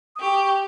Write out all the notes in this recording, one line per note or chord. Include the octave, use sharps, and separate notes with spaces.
D#6
G4 C#6